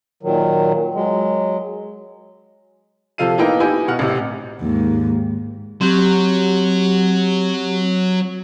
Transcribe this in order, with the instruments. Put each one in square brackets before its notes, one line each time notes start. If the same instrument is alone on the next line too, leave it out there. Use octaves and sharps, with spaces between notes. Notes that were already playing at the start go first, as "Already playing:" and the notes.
[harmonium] A#2 D#3 F#3
F#3 G#3
[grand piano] C3 F3 A4 F5 D#7
A#3 B3 D#4 E4 G5
D#4 E4 G4 G#5
B2 F#5 F6
A1 C3
[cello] D#2 G#2
[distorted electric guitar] F#3 [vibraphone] C4 G4